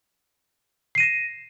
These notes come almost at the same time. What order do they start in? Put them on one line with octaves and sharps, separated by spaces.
C7 D#7 A#6 E7